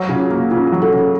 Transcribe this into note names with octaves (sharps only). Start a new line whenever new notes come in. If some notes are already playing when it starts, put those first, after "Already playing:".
Already playing: F#3
C#3 F4
F#4
A#3
C#3 F4
F#4
F#3
A4
C#3 A4